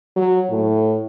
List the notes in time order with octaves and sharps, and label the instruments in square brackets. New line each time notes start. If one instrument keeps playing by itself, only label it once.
[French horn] F#3
A2